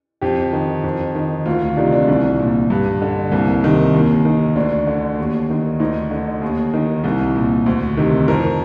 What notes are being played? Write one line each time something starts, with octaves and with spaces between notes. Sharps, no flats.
F2 G4
D#3
F2
D#3
D2 F4
F4
C3 D#3 D4
D4
C2 D4
A#2
G2
D3
C2 A#3
C3 D#3
D#2
D#3
D2 D4
D3
D#2
D#3
D2 D#4
D3
D#2
D#3
C2
A#2
D2
C3 D#3
F2 A#4